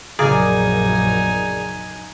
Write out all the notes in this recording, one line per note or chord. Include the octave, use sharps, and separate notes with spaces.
A#1 F#2 C#3 D#4 G#4 A#4 D5 G#5